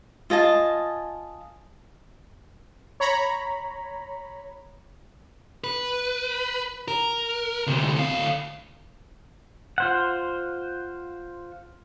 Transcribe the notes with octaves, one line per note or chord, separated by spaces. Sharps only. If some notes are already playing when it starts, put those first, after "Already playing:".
F4 D#5 G#5 A5
C#5 A#5 B5
B4
A#4
D2 C3
D2 F5
F4 C5 F#5